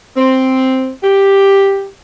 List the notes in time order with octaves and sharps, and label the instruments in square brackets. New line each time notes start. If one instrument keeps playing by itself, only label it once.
[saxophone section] C4
G4